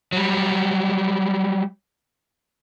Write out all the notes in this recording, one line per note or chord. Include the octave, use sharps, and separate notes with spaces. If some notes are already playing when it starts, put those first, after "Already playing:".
F#3 G3